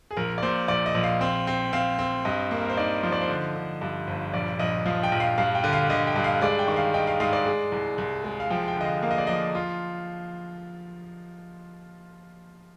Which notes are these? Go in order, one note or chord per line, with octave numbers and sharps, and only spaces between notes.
G#4
A#1 A#4
D5
A#2 C5
A#1 D5
D#5
A#1
F5
C4
C4
C4 F5
C4
G2 D#5
A#3
A#4
C5
D#4 D5
F3 C5
D5
C5
D3
D3
G2
G1
A#1 D5
A#1 D#5
F3 F5
G5
A#1
F5
G2 F5
G5
D3
F5
D3 D#5
G5
G2
F5
G#3 D5
G5
D#3
F5
D#4 G5
F5
G#2 F5
D5
G#3
C2
C2
G#3
F5
F3 G5
G5
D3 D#5
F5
A#3 F5
D#5
D5
F3 D#5
F4